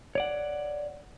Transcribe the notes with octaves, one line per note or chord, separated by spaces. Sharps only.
C#5 D5 F#5